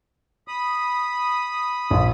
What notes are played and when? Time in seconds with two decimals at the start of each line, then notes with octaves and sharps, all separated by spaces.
0.48 B5 D#6
1.90 A#1